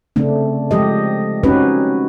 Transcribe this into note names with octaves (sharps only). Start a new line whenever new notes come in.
C#3 A3 C4 D4
F3 G#3 G4 D#5
C4 C#4 D#4 F#4 G4 B4